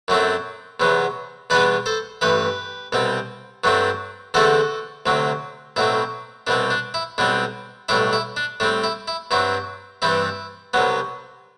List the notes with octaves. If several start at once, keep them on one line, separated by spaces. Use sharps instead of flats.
F#2 F#3 A3 C4
E2 C3 F#3 B3
E2 B2 G3 B3 D4 B4 D5
A4 C5
A1 G2 E3 G4 B4
C2 B2 G3 C4
G2 F#3 A3 C4
E2 D3 A3 C4 F#4 A4
D2 C3 F#3 C4
B1 A2 F#3 C4 E4
C2 B2 G3 C4 D4
D4
E4
B1 B2 G3 C4 D4
B1 A2 G3 D4 E4
E4
D4
A2 G3 C4 D4
E4
E4
G2 F#3 C4 E4
G2 E3 G3 C4 E4
C2 C3 F#3 B3